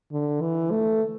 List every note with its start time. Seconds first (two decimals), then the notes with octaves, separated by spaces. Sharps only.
0.12 D3
0.41 E3
0.71 A3